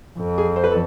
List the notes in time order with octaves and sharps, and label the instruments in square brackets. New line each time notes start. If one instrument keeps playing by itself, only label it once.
[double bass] F2
[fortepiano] G#4
C5
B4
A4